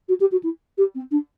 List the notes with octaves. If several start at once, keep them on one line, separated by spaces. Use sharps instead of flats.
F#4
G4
F#4
E4
G4
C4
D4